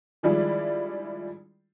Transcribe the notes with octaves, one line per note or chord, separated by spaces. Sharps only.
D#3 F3 G3 G#3 D4 E4